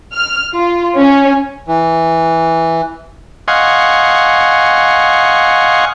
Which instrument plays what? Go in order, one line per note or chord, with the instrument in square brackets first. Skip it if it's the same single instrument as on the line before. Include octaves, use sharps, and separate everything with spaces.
[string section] F6
F4
C#4
[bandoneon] E3
[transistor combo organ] D#5 F5 F#5 G#5 C6 C#6